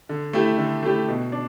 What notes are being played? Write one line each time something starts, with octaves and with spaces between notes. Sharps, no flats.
D3
A3 E4 G4
D3
A3 E4 G4
B2
D4